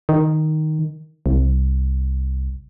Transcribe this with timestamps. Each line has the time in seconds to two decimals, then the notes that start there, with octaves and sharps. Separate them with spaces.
0.09 D#3
1.26 C2